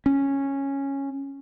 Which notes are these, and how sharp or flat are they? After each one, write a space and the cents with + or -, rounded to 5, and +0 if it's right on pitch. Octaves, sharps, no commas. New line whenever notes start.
C#4 -5